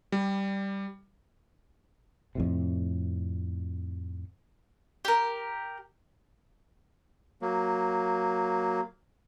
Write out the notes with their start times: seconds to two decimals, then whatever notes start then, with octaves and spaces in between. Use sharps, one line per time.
0.12 G3
2.35 F2 A2 C3
5.05 G4 A#4
7.42 F#3 A#3